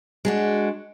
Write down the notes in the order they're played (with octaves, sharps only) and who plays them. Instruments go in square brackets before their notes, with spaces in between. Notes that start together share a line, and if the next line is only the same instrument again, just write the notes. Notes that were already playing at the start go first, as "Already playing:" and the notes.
[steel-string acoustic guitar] G#3 D4 F#4